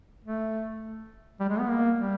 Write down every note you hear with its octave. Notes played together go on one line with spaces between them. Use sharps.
A3
G3
G#3
B3
A#3
G3